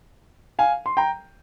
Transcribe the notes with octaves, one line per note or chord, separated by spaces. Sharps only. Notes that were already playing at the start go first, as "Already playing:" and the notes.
F5 G#5
C6
G5 A#5